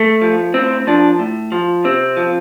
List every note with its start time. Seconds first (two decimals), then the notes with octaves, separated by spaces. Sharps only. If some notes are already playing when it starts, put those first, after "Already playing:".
Already playing: A3
0.22 F3
0.54 A2 C4
0.87 F3 D4
1.19 A2
1.52 F3
1.84 C3 C4
2.17 F3